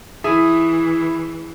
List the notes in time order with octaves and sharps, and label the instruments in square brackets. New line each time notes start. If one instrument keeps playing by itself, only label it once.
[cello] E3 [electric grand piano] E4 E5 [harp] G#4